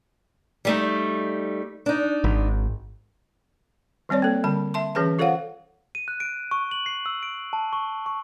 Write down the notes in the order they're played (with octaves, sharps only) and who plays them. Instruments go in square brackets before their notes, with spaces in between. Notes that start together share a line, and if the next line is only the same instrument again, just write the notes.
[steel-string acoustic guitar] G3 A3 D#4
D4 D#4
[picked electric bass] G#1
[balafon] D#3 G3 C4 C#5 D5
A#3 A4
D3 G3 A5
E5 A5 C6
E3 C#4 G#4 B4 A5
F4 A4 C5 C#5 F5 F#5
[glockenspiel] D#7
F#6
D7
C#6
F#7
C7
E6
D7
A5
C#6
C#6